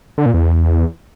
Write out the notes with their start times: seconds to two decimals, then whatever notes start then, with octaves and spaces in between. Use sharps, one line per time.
0.18 D3
0.26 A#2
0.34 E2